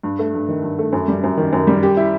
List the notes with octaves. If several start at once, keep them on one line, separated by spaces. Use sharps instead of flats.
G2
A3
G2
D#3
G2
A3
F#2
G3
F#2
D#3
F#2
G3
G4
E4